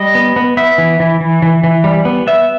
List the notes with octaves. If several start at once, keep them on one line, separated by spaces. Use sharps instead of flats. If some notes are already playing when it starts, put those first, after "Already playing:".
Already playing: G3 D#5
B3
B3
B3 E5
E3
E3
E3
E3
E3
G3
B3
B3 E5